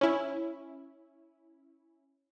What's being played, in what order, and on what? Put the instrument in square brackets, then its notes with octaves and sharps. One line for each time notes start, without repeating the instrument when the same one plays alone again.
[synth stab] C#4 E4